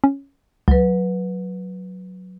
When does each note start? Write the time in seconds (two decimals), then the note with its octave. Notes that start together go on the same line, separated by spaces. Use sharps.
0.04 C#4
0.68 C#2 F#3 B4